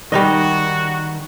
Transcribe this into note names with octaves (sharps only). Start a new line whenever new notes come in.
D#3 G3 D#4 F#4 D#5